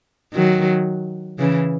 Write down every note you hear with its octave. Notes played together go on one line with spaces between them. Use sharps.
D#3 F#3
C#3 E3